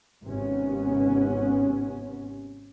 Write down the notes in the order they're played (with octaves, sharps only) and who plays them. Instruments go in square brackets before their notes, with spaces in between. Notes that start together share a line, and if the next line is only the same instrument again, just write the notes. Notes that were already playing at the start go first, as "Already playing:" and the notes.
[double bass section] G#1 C3 B3 C#4